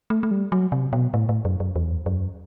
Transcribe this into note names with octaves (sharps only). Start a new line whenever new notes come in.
A3
A3
G3
F#3
C3
B2
A2
A2
F#2
F#2
E2
F#2